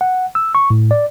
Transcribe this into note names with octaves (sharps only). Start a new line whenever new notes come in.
F#5
E6
C#6
A2
D5